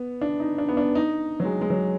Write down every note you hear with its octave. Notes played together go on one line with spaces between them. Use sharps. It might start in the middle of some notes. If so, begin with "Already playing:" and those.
Already playing: B3
D4
D#4
D4
B3
D4
D#4
F#3
G#3
G#3
F#3